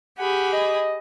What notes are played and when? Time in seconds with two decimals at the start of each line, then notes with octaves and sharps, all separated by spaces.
0.18 G4 G#4 F#5 B5
0.53 D#5